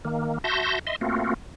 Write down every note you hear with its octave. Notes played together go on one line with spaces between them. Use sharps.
D#3 A#3
F#4 E5 A5 C6 G6 A#6
D#5 E5 C6
A3 A#3 C4 F4 F#4